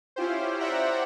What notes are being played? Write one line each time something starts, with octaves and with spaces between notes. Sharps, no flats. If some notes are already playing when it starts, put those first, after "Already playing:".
C#4 E4 F4 G4 C5
C5 D5 E5 F#5 G5 A#5